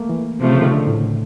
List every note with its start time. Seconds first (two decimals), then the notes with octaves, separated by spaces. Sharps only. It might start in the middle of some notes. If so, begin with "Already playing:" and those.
Already playing: A3 A#3
0.09 E3
0.40 C3 F3 A3
0.50 C#3
0.61 D#3
0.72 D3
0.87 A2